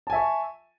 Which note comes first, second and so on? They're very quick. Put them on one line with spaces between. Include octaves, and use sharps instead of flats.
A5 G#5 E5 C#6